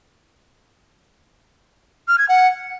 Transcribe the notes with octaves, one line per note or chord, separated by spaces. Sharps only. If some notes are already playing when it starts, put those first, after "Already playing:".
F6
G#6
F#5